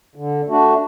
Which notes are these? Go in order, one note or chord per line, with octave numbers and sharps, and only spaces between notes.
D3
A3 D4 F#4